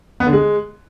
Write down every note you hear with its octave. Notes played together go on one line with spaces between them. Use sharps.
B3
D3
G#3